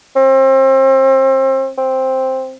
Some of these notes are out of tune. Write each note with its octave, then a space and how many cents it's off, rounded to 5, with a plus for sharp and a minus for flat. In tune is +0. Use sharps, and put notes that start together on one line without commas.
C4 +35
C4 +5